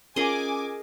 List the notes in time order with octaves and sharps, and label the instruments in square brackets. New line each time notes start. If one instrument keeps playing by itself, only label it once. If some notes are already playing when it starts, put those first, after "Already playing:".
[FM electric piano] C#4 F4 [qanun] G#4 A#4 D#5 [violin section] G#5 D6